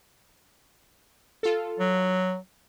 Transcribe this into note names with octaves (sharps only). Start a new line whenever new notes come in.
F4 A4
F#3